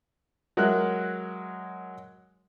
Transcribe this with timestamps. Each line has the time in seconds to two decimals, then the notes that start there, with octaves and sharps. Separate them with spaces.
0.57 F#3 G#3 A#4 E5 F#6